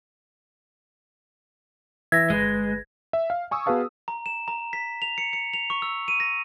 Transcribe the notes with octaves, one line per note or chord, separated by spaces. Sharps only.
E3 E5 G#6 A#6
G1 G#3 B4
E5
F5
G#5 C#6 D#6 E6
B3 F#4 G#4 B4 F5 A5
A#5
E7
A#5
B6
F7
C#7
C#7
F7
C#6
E6
D#7
A#6